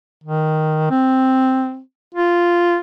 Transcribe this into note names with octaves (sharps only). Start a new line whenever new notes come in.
D#3
C4
F4